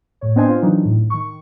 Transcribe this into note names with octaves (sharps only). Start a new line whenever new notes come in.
A2 C#5
B3 C4 D4 C5 D#5 G#5
F4
D#3 E3 F#3 D4 D#4
A2
D#3 C#6